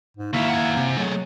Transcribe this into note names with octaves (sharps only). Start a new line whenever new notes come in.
G#2
D#2 A#3 E4 F#4 E5
F#5 G#5
C3
F#3 A3 G#4
F#3